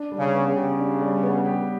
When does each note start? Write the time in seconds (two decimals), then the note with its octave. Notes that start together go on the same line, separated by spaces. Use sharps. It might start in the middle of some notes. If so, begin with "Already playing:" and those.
Already playing: D4
0.12 G3
0.18 C#3
0.34 B3
0.48 C#3
0.56 G4
0.79 D4
1.01 G3
1.23 B3
1.46 G4